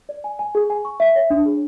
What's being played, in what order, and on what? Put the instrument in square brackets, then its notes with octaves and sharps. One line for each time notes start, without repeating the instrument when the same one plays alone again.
[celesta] D5
G#5
G#5
G#4
G#5
C#6
E5
C#5
D4
G#4